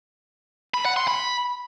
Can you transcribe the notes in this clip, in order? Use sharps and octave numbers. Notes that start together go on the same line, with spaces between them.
B5
F#5
C6
B5